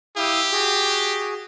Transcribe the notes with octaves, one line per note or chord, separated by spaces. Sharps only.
E4 G4 F5 D#6
F#4 G#4